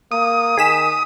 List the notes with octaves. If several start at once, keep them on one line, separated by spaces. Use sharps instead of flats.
A#3 D#6
D#3 G#4 B6 E7